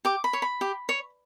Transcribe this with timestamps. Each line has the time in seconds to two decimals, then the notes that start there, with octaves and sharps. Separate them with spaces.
0.05 G4 D6
0.24 B5
0.33 C#5
0.42 B5
0.61 G4
0.89 C#5